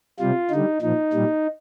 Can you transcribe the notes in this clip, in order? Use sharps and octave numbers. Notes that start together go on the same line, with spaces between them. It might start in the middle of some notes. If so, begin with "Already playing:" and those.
C3 G3 F4
D3 G3 D#4
A#2 F3 D#4
A#2 G3